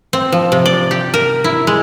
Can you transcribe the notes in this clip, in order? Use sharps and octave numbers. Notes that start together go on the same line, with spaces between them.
C4
F3
C3
D5
G4
A#4
E4
G#3